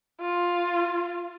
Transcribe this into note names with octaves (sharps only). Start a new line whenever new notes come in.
F4